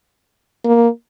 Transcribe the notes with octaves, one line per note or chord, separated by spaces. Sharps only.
A#3